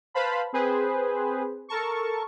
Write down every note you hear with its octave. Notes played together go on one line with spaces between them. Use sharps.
B4 C5 F5 A5 B5
C4 G#4 B4 C5
A4 A#4 A5 C#6